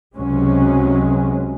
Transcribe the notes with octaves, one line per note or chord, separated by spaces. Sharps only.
C#2 C3 F#3 G#3 C#4